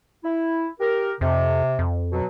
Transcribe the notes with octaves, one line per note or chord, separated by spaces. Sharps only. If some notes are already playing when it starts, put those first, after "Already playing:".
E4
G4 A#4
F2 C3
F2
B2 F#3